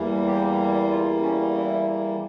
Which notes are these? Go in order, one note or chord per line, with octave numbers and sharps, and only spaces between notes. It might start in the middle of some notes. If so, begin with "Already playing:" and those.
Already playing: E2 E3 G3 A#3
G4
F4
C#4
E4